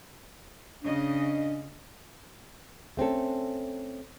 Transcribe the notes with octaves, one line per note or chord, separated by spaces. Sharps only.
C#3 D4 D#5
A3 C4 C#4 A4